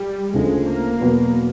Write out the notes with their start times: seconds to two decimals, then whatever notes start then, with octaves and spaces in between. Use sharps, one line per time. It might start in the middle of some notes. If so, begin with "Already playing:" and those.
Already playing: G3
0.34 D2 C#3 F3 G#3 A3
0.67 A#3
1.00 E2 B2 F#3 B3